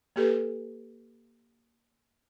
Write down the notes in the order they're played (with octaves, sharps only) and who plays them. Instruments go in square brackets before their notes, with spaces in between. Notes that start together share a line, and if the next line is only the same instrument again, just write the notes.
[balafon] A#3 G4 A4 B4